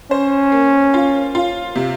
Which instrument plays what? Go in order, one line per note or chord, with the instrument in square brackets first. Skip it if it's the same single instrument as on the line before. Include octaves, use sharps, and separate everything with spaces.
[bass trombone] C#4 [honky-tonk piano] C5
[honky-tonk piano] A#3
F4
F4
C3